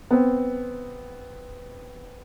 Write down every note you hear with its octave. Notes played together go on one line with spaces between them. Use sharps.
B3 C4